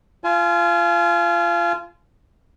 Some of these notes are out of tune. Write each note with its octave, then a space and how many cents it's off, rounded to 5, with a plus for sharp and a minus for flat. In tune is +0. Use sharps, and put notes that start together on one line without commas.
F4 -20 G#5 +35